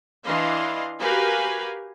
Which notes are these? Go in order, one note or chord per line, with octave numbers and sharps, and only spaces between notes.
E3 D4 E4 D#5 F5 C6
F#4 G4 A#4 B4 F5 G#5